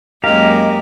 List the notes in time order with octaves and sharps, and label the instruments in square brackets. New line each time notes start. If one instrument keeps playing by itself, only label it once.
[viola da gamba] F#2 G#3 A#3 [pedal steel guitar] G4 A#4 F5 [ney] D#5